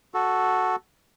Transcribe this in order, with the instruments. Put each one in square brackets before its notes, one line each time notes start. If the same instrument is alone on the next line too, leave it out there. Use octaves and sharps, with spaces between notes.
[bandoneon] F#4 A4